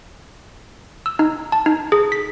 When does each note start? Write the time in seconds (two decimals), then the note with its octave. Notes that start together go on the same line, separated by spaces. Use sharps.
1.06 E6
1.19 D#4
1.52 A5
1.66 D#4
1.92 G#4
2.12 B6